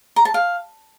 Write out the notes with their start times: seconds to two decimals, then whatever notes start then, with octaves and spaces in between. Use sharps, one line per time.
0.16 A#5
0.25 A5
0.34 F5